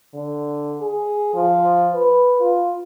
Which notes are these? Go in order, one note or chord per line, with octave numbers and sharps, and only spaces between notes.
D3
G#4
F3
B4
F4